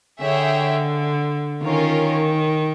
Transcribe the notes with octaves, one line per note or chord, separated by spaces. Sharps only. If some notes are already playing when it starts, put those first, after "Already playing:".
D3 G#4 C#5 E5 G5
D#3 C#4 F4 A#4 C#5